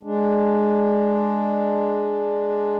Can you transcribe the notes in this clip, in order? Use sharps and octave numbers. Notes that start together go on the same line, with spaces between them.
G#3 D4